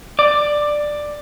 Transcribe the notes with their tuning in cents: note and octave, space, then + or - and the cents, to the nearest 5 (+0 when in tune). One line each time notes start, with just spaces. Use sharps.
D5 +10